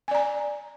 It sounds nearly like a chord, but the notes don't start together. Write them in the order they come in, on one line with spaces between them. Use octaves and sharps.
G#5 D5 A#5